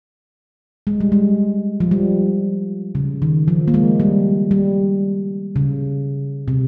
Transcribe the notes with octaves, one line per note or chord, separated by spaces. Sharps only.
G#3
G3
G#3
F3
G3
C#3
D#3
F3
A#3
G#3
G3
G3
C#3
C3